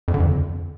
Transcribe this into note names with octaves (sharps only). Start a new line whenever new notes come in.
F2
D3
F2